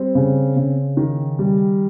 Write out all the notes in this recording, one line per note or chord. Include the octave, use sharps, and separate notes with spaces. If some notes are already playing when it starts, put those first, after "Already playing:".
Already playing: G3 C4
C#3
C#3
D#3
G3